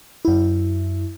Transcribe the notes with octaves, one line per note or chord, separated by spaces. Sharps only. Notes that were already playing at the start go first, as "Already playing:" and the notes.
F#2 E4